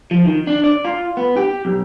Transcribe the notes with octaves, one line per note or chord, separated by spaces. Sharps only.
F3
D#3
D4
D5
F4
B3
G4
B1